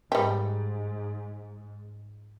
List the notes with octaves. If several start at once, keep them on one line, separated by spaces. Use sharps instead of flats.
G#2 G3 G4